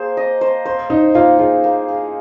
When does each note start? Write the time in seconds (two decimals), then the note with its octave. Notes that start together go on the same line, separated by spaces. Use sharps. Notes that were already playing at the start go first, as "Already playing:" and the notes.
Already playing: A#3 G#4 C5
0.17 D#5
0.41 C5
0.66 C5
0.90 D#4 C5
1.14 A#3 F4
1.39 F4 G#4
1.64 A#3
1.88 G#4